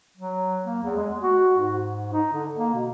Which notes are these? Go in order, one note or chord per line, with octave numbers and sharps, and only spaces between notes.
F#3
A#3
E2
G#3
F#4
G#2
D#4
D3
A#3
B2